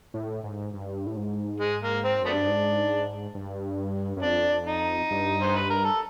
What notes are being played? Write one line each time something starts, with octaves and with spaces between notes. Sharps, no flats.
A2
G#2
G2
A2
G#2
G#3
A#3
C4
F#2 A3 B3 D4
G2
G#2
G2
F#2
F2 D4
D#4
G2
C5
B4
A#4
A4